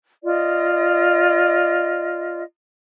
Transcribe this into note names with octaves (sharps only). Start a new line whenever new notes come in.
F4 D5 D#5